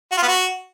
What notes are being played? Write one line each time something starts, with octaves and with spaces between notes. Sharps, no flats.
F#4
F4
B3
F#4